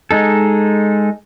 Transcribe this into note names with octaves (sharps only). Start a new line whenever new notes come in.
G#3 D#4 A4